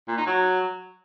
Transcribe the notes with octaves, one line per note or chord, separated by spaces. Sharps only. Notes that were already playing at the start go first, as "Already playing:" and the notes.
A#2
D#4
F#3